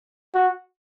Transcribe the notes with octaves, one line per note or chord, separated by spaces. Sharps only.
F#4